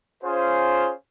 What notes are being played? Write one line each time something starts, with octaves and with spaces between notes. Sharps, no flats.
C#4 F4 G#4 C5